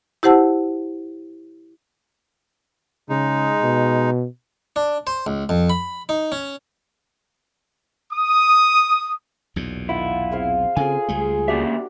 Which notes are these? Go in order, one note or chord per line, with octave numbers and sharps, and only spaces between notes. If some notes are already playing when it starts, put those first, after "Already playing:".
E4 G4 C5 F#5 A5 E6
C#3 G#3 D#4
B2
D4
C5
C#2
F2
B5
D#4
C#4
D#6
B1 E2 A#2
D#3 E4 F4 F#5
C4 G#4 C5 F5
C#3 C4 F4 G#4 A4 G#5
C#2 G3 A3
D2 A#3 D4 F#4 G4 E5